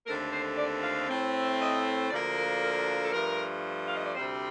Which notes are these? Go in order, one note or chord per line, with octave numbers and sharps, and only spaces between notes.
D#2 D3 A3 C4 A#4
C5
D5
F5
A2 A3 C4
D#5
D2 D3 F3 A#3 D5
A#4
A#4
A4
G2 F3 A3 A#4
F5
D#5
D5
D2 C3 G3 C4 C5